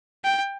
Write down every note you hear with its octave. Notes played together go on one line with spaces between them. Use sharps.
G5